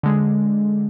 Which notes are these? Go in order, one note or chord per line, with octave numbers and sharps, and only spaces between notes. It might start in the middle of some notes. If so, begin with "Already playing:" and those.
D3 G#3